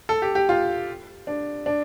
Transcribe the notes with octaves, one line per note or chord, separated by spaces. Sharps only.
A4
G4
G4
F4
D4
D4